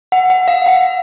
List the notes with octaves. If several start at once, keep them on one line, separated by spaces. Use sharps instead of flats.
F#5
F#5
F5
F#5